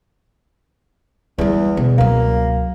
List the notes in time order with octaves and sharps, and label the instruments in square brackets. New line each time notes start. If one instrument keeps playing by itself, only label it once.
[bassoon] E2 [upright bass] G3 B3
[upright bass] B2
[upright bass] C#2 F#3 [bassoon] A#3